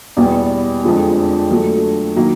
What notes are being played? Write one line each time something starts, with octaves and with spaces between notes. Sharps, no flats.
E2 B2 G3 B3
F2 D3 F3 G#3
D3 F#3 A3
D#3 F#3 A#3